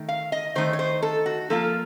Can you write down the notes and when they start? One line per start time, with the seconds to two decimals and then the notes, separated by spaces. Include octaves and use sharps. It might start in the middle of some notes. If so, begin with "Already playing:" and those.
Already playing: D#3 A3
0.08 F5
0.32 D#5
0.55 D#3 A3 D#4 C5
0.73 C#5
0.79 C5
1.02 A4
1.26 F#4
1.50 F3 A#3 F4 A4